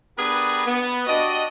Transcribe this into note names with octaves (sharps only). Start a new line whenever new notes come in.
B3 D4 G4 G#4 A#4 B4
B3
D4 F#4 G4 D#5